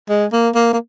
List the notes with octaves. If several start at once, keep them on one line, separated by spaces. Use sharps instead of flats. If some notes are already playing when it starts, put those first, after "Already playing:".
G#3
A#3
A#3
A#3